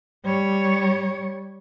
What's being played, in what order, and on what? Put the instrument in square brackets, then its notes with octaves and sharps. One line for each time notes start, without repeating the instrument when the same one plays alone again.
[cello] G3 C#5